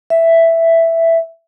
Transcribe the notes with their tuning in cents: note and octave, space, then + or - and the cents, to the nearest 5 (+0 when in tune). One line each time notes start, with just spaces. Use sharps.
E5 +5